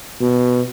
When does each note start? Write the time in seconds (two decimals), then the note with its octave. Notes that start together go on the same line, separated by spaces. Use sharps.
0.21 B2